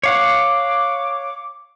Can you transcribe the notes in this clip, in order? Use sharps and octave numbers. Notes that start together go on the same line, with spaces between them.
C#5 F5 F#5 D6